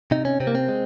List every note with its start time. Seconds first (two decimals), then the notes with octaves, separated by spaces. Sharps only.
0.11 C3 D#4
0.25 C#4
0.40 C3 C4
0.47 A#3
0.55 C4
0.68 G#3